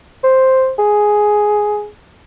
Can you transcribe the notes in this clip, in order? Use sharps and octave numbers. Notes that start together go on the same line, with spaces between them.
C5
G#4